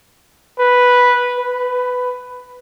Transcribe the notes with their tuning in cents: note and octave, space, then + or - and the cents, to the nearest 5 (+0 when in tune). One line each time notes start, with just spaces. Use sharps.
B4 -5
B4 +15